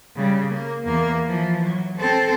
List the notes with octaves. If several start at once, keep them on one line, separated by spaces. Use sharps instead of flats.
C#3 G3
A#3
E2 A#3
E3 F3
F#3
C4 A4